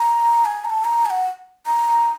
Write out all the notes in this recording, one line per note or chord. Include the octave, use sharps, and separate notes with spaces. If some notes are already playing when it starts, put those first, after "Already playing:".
Already playing: A#5
G#5
A#5
A5
A#5
G#5
F#5
A#5